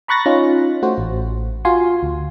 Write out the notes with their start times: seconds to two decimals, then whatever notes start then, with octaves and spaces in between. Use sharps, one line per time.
0.08 A#5 B5 C#6 F#6 A6 A#6
0.26 C#4 D#4 F4
0.83 A3 F#4 C5
0.98 A1
1.65 F4 F#4 G#5 C6
2.03 D2